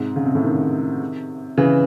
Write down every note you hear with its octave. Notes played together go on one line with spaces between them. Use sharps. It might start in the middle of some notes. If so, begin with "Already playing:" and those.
Already playing: G#2 C3
C#3
C3
A2 C#3
C3 D#3
C#3 E3